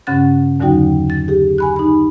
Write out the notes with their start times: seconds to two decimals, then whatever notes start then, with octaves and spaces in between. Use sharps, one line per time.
0.07 G2 C#3 C#4 F#5 F#6 A6
0.60 E2 D3 F#3 D#4 F#4 G5
1.10 A6
1.28 G4 G#4
1.58 G#5 B5 F#6
1.76 D#4 B5